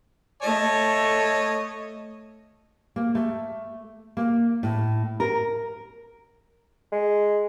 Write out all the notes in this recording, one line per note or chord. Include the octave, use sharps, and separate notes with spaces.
A3 C#5 D#5 A5
A#3
A3
A#3
A2
A#4
G#3